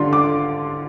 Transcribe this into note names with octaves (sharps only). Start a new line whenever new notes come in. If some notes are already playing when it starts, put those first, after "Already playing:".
Already playing: D3 G3 D4 F4 C6
D6